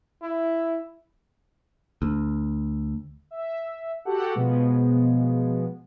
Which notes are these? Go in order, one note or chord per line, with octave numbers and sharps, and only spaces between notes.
E4
D2
E5
F#4 G4 A4 F#5
B2 F3 G#3 B3